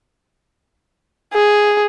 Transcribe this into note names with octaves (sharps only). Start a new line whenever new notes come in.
G#4